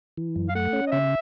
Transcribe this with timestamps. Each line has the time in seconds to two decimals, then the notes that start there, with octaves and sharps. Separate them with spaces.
0.17 E3
0.36 F#2
0.49 F5
0.55 A3 F#5
0.73 C#4
0.87 D#5
0.92 C#3 E5